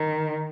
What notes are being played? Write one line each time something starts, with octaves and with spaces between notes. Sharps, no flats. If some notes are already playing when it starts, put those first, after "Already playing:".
Already playing: D#3